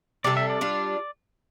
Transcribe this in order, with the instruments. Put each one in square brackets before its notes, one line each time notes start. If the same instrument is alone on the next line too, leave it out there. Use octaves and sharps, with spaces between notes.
[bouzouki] C3 G3 D4 A4 [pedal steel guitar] D5
[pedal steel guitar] E5
D5
[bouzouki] G3 D4 F4